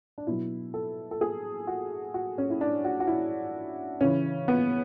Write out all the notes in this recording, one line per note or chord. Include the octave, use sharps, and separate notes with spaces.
D4
B2 F#3 E4
A4
A4
G#4
F#4
F#4
C#4
E4
D4
F#4
F#4
E4
C#3 E3 C#4
B3